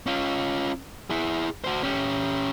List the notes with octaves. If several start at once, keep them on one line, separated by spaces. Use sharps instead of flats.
C#4 F4
E4 G#4
F#4 C5
C#4 G4